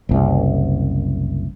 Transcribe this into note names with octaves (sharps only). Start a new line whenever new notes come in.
F#1 C2